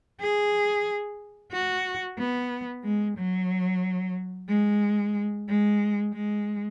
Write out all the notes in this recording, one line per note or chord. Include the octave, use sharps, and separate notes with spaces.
G#4
F#4
B3
G#3
F#3
G#3
G#3
G#3